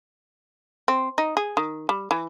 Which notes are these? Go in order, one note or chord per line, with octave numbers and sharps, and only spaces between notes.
C4
D#4
G#4
D#3
G3
E3